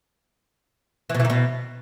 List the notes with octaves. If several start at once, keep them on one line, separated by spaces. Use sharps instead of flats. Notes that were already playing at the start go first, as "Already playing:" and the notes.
E3
B2
E3
D#3
B2